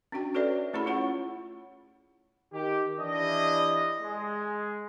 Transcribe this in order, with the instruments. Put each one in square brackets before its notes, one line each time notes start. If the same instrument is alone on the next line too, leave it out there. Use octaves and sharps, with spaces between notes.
[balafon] C#4 D4 F#4 G5
F#4 A4 B4 C#5 D5 E5
A3 C#4 E4 G#4 B5
F4 G#4 C#5 F#5 C#6
[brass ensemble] D#3 G4
E3 D4 E4 G4 D#5
G#3